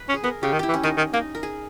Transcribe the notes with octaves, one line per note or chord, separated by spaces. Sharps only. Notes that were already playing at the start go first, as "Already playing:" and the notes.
Already playing: B4
C#4
G#4
B3 A#4
C#3 G4
D#3
E4 G4
E3
C#4
D#3 D#4
D#3
A#3 D#4
A#4
G#4